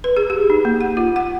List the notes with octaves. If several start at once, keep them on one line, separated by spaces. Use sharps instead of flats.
B4
G#4
G4
D#4
A#3
F#5
F4
F#5